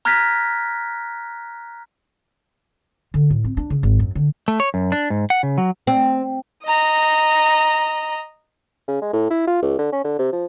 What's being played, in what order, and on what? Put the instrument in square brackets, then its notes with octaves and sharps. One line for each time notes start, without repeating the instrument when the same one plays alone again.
[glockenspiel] A#5 F6 F#6 G#6 A#6 B6
[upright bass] D3
A2
C4
D4
C#3
G#1
F#2
D3
[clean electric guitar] A3
C#5
F#2
D4
G#2
F#5
C#3
F#3
[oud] C4
[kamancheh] D#5 A#5
[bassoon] C#3
G#3
A2
E4
F4
C#2
D3
C#4
D3
C3
F3